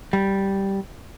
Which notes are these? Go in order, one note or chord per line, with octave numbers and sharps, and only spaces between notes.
G3